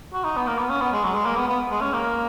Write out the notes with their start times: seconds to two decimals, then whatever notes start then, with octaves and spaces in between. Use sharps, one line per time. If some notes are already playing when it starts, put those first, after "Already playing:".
0.13 F#4
0.24 D#4
0.36 B3
0.47 A#3
0.58 B3
0.70 C#4
0.81 B3
0.92 G#3
1.04 F#3
1.14 G#3
1.25 A#3
1.36 B3
1.48 B3
1.71 G#3
1.81 C#4
1.93 A#3